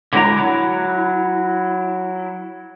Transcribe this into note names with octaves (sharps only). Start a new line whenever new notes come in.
D3 F#3 G#3 E4 A#4 A#5
F#3 E4